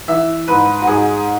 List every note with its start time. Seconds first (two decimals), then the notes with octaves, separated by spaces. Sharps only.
0.08 E3 E5
0.48 G#2 B4
0.81 F#4
0.87 G#2 G#4